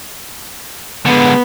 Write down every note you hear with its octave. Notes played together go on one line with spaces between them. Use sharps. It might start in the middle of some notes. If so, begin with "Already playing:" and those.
D3 G#3 B3